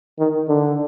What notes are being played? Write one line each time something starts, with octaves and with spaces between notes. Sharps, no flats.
D#3
D3